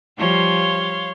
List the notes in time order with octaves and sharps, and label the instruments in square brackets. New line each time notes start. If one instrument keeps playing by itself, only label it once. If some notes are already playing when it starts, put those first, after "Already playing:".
[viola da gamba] F3 G3 [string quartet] C#5 F5 C6